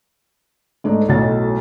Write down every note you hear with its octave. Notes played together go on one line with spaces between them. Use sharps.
G#2 A3 D4 D#4
B1 A2 F#3 A6